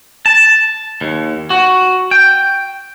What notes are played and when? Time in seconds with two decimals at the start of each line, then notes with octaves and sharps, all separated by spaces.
0.26 A5
1.01 D#2
1.50 F#4
2.11 G5